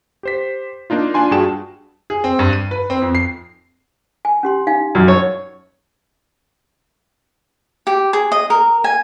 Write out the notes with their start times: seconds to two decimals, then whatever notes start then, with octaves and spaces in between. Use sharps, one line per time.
0.23 G4 C5 B6
0.90 A#3 D4 D#4 F4
1.14 D4 F4 G#5 C6
1.31 G2 F#4 G#4 G5 A5 E7
2.10 G#4
2.24 C4
2.39 G2
2.53 D#7
2.71 B4
2.90 C4
3.02 F2
3.15 C7
4.25 G#5
4.43 C#4 G4 C6
4.67 D#4 F5 G#5
4.95 F#2
5.08 C#5
7.87 G4
8.13 G#4
8.32 D#5
8.50 A#4
8.84 G#5